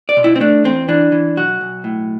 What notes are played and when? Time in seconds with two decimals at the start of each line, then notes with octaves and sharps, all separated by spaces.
0.09 D5
0.17 B2
0.24 E4
0.36 C4
0.40 A3 D4
0.64 E2 C4
0.88 E3 D4
1.12 E3
1.37 B1 F#4
1.61 B1
1.84 A2